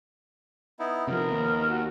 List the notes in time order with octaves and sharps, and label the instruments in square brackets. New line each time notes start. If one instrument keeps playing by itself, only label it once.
[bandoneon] B3 D#4 E4
[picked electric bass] C3 D#3 F3 [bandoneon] B3 [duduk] A#4
[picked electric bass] D#2
[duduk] F#4